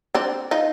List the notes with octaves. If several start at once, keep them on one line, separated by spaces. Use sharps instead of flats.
C4 D4
D#4 F4